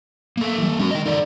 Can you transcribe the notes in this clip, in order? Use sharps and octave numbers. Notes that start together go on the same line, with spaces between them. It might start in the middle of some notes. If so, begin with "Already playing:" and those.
A#3 A4
E3 G3
G#3 C#4 F#4
D#3 D#5
D#4 A4 D5